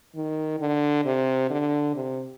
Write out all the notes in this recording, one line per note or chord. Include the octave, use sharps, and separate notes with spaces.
D#3
D3
C3
D3
C3